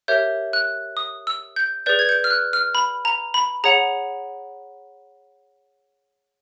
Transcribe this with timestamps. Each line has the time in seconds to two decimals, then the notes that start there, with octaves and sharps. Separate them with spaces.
0.08 G4 A#4 C#5 E5 G6
0.53 F#6
0.97 D#6
1.27 E6
1.56 G6
1.86 G#4 B4 D5 G6
1.99 G#6
2.09 G6
2.24 F6
2.30 F#6
2.53 F6
2.75 B5
3.05 A#5
3.34 B5
3.64 G#4 C#5 F#5 A#5